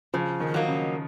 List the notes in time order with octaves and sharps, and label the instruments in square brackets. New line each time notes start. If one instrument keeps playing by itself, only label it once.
[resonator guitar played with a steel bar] C#3 [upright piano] F3
[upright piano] D#3
[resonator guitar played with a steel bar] F#3 A#3 D#4
[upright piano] C#3